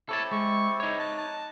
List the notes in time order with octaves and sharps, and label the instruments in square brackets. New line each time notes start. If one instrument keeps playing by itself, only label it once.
[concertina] C4 E4 G4 [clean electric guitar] A4 C#5 A5
[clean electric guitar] G#3 [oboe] C#6
[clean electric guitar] D#4 C#5
[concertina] D#5 F#6 [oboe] A5
[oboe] A5